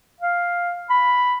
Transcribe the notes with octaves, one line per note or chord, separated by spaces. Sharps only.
F5
B5